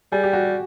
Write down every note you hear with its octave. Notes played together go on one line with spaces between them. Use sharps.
G3 G#4
G4
F#4